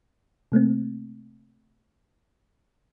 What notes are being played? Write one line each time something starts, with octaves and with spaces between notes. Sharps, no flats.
C3 A3 A#3 C4